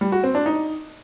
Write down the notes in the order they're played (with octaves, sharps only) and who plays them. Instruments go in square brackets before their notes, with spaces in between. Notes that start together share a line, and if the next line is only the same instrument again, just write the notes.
[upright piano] G3
F#4
C4
D4
D#4